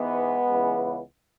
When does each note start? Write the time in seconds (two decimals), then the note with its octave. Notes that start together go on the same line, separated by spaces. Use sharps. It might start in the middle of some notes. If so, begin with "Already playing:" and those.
Already playing: G#2 E3 G#3 B3
0.48 C#2 C#3 E3